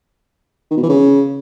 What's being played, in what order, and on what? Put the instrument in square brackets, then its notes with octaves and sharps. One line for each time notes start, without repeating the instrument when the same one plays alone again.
[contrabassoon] D#3
B2
E3
C#3